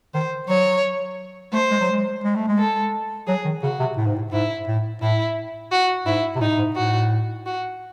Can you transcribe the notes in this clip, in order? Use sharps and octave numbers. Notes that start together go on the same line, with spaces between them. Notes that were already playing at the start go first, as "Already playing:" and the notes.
D#3 C5
F#3 C#5
A3 C5
G#3
F#3
G#3
G#3
A3
G#3
A4
F#3 G#4
D#3
C#3 F#4
C3
A2
G#2
A2
G#2 E4
A2
A2 E4
F#4
G#2 E4
C3
A2 D#4
G#2
A2 F#4
F#4